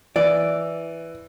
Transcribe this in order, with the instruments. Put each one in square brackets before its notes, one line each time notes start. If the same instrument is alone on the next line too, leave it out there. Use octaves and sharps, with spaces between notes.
[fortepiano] E3 [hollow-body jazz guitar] D5